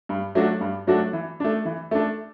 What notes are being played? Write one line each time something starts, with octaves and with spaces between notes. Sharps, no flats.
G2
F#3 A3 D4 F#4
G2
F#3 A3 D4 F#4
E3
A3 D4
E3
A3 D4